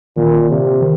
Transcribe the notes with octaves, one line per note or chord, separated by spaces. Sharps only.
A#2 D#3
C3
D#3